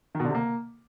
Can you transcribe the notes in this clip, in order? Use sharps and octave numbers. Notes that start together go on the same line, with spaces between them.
D#3
B2
D3
C3
A#3